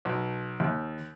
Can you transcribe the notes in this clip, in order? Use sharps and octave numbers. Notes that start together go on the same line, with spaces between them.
B1
D#2